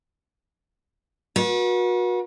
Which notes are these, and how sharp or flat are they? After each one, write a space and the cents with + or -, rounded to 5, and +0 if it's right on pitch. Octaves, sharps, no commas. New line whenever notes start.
F#4 -30 B4 -45